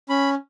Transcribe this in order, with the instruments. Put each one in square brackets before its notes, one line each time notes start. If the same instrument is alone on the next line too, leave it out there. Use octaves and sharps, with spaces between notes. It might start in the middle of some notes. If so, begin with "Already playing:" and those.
[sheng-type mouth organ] C#4 B5